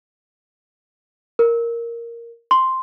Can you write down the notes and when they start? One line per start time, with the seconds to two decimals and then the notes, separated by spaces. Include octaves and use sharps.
1.39 A#4
2.51 C6